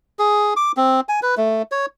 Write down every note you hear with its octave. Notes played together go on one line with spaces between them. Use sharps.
G#4
D6
C4
G#5
B4
A3
C#5